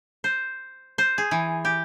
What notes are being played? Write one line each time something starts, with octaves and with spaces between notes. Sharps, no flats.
C5
C5
G#4
E3
G4